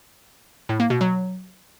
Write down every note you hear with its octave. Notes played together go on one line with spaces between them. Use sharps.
A2
A#3
B2
F#3